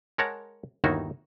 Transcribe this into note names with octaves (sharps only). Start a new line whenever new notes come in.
G#3 A#4 C#5 F#5 A5 A#5
G1 D#2 D#3 D#4 E4 F#4